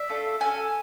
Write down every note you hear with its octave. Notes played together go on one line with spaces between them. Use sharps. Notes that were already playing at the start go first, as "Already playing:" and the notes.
Already playing: D5 E5
A3 D4 F4 A4
C#4 F#4 A4 F#5 G#5